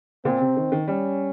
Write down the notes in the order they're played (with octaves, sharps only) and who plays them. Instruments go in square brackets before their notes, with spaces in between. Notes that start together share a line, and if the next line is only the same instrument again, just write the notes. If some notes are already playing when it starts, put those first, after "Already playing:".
[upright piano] A#2 [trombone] C4
[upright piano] C3
D#3
D#3
[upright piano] G3 [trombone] C#4